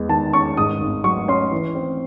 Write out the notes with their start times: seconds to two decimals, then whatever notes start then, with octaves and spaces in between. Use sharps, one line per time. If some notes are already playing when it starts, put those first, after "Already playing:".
Already playing: E2 G#3
0.09 D#3 A5
0.33 C#4 C#6
0.57 G#2 D#6
0.81 G#1
1.04 F#3 C#6
1.28 C#4 C6
1.51 E3
1.75 C4